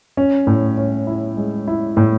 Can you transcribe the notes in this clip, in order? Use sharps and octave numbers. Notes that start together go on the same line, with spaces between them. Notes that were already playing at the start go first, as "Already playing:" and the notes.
C#4
A2
C#4
E4
G#3
E4
A2